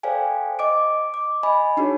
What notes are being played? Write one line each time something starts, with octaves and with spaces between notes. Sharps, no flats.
A4 C5 D5 F5 G5 G#5
D#5 D6 D7
D6
D#5 G#5 B5
D4 D#4 F#4 G#4 C#5